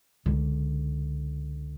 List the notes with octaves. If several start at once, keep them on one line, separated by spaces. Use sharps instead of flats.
C#2 D3